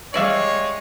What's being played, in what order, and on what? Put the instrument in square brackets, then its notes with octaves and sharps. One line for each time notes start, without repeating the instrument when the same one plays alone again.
[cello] G3 [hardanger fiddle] G#3 [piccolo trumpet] C#5 [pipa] D5 E5 F5